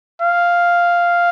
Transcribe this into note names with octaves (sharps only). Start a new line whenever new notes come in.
F5